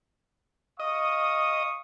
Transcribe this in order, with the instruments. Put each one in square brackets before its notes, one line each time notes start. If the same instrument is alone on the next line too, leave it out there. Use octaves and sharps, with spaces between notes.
[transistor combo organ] D#5 [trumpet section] F5 C#6 D#6